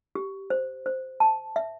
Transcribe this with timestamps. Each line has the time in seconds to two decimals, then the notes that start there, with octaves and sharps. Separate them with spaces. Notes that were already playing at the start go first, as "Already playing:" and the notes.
0.15 G4
0.50 C5
0.86 C5
1.20 A5
1.56 E5